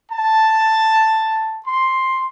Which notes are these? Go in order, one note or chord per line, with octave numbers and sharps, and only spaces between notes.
A5
C6